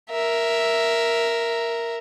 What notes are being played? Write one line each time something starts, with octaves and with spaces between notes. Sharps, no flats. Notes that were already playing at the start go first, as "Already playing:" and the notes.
A#4 E5